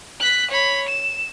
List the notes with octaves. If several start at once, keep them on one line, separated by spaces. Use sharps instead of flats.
F#6 B6
C#5 B5
E7